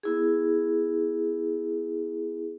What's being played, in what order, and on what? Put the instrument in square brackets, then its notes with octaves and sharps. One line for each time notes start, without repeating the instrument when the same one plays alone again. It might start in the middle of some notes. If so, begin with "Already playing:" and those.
[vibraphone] B3 E4 G#4